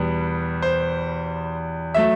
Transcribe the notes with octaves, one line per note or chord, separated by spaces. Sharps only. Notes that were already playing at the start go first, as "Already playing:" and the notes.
Already playing: E2 B2 G3 B3
C5
F#3 A3 E5